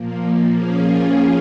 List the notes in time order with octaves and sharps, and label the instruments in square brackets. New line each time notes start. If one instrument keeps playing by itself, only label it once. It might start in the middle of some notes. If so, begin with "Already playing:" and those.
Already playing: [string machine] A#2 F3 A#3
F3 A#3 C#4 F4 G#4